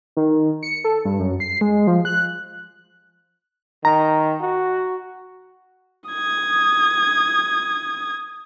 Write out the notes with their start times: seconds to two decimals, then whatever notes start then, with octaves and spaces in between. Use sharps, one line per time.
0.17 D#3
0.63 C#7
0.84 A4
1.05 G2
1.19 F#2
1.40 C7
1.61 G#3
1.87 F3
2.05 F#6
3.85 D#3 A#5
4.41 F#4
6.11 D#6 G#6